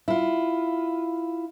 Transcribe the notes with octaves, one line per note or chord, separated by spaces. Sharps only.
E4 F4